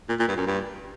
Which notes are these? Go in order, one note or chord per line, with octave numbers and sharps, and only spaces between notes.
A#2
A#2
G2
F#2
G2